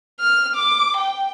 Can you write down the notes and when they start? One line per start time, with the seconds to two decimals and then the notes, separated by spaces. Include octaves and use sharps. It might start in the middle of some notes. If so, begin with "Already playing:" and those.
0.20 F6
0.56 D6
0.97 G5